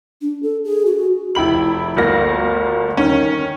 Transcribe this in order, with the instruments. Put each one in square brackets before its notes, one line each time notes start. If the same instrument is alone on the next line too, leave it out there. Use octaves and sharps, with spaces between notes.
[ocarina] D4
A4
G#4
F#4
[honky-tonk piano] F1 E4 G5 B5 F#7
G1 D2 A#3 F5 A#6
D#3 C#4